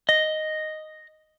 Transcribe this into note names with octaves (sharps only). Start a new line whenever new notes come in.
D#5